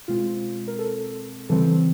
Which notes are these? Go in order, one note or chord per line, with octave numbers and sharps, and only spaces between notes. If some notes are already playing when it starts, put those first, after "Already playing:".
B2 G#3 C4 F4
A#4
A4
C#3 E3 G3 C4 A4